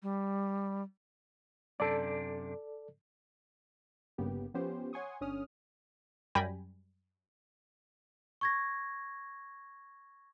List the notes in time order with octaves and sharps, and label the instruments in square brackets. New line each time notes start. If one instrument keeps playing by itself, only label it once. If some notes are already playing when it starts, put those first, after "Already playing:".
[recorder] G3
[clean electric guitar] F#2 C3 D4 [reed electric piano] A4 D5
[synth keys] G1 G2 C#3 A#3 B3 G4
F3 B3 C#4 G4 C5
C#5 F#5 G#5 C6 C#6 D#6
G1 D3 C#4 D#6 F6
[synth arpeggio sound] F#2 G3 G5 G#5 B5 A#6
[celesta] C#6 G#6 A#6